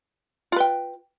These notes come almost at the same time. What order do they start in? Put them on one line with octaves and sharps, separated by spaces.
F4 B4 G5